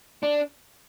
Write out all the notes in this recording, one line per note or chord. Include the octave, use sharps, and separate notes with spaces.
D4